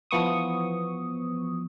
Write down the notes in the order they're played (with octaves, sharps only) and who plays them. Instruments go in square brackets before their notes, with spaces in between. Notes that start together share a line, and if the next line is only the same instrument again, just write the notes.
[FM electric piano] E3 F3 B3 C#6 D#6